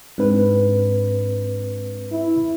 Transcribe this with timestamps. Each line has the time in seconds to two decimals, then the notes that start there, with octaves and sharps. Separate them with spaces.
0.18 G#2 C4 D4 B4
2.12 E4